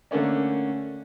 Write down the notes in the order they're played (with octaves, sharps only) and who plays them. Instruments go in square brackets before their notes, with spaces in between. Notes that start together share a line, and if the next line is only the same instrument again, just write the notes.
[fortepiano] D3 A3 A#3 C#4 D4